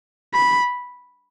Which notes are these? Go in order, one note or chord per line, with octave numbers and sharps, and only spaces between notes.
B5